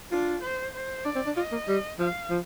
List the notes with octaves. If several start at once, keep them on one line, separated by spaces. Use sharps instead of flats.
D4 F4
C5
C5
D4 D5
C4
D4
F4 D#5
A#3
G3
F3 F5
F3